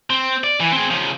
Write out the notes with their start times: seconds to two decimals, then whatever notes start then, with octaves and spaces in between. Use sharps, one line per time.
0.10 C4
0.44 D5
0.60 E3
0.72 C4 G#4
0.91 C#3 F3